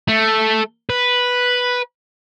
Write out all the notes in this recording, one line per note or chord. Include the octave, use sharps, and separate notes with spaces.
A3
B4